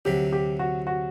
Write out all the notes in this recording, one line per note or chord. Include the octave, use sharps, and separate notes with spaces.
D2 C3 F#3 G4
G4
F#4
F#4